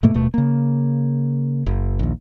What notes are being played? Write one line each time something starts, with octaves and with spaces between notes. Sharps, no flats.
G#2 B2 A3 A#3
D#1 B2 A3
C#3 A#3
F#1
A#1 D#2